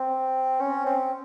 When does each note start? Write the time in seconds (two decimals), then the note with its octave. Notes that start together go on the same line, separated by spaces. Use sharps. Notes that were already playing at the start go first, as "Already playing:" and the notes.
Already playing: C4
0.61 C#4
0.86 C4